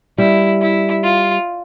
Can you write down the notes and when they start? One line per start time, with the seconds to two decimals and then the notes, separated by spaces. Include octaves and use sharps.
0.18 G3 E4
0.61 E4
1.03 F4